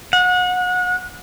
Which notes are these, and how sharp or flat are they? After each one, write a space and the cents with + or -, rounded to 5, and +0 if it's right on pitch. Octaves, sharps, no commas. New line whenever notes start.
F#5 -30